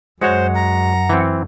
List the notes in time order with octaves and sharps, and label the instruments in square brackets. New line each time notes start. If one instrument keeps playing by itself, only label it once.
[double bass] F#2 [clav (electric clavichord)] G#3 F#4 C#5 [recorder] C5 [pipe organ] F#5
[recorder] A#5
[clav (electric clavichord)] E3 C4